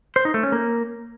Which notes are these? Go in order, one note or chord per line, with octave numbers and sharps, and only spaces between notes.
C5
D#4
A3
C#4
A#3